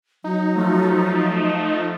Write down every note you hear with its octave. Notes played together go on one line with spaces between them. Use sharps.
F#3 D#4
F3 A3